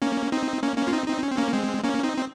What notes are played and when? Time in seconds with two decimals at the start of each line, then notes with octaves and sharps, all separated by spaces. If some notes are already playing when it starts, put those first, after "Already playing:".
0.02 A#3 C#4
0.32 C4 D#4
0.63 A#3 C#4
0.77 A#3 C#4
0.87 F4
0.93 C4 D#4
1.07 C4 D#4
1.23 C#4
1.30 C4
1.37 A#3 C#4
1.53 G#3 C4
1.84 A#3 C#4
2.03 C4 D#4
2.17 C4